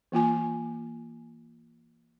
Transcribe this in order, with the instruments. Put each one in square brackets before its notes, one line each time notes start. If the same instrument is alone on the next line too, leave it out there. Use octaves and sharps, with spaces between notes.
[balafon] E3 A#3 F4 G#5